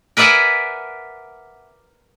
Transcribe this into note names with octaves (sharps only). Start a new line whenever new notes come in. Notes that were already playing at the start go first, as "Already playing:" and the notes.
A#4 B4 D5 E5 F#5 G#5